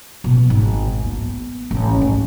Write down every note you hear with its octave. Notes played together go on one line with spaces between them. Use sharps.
B2
G#1
B3
A1
G#1